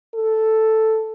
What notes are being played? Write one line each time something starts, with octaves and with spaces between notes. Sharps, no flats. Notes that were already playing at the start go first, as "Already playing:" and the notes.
A4